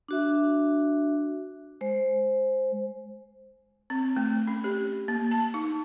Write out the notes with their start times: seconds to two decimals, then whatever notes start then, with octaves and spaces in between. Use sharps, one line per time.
0.08 D4 F#4 E5
1.81 G#3 C5
3.90 C4
4.17 A3
4.47 C#4
4.64 G4
5.08 A#3
5.31 A5
5.54 D#4